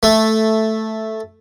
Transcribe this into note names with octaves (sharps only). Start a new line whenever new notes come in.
A3